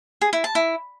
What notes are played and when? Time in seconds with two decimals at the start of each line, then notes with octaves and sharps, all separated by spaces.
0.21 G#4
0.33 E4
0.44 A5
0.55 E4